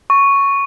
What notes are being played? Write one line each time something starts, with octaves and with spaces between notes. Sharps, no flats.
C#6